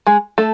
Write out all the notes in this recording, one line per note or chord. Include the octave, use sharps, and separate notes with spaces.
G#3 G#4
A3 A4